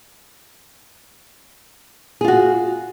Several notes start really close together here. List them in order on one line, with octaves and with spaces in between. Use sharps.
G#4 F4 F#4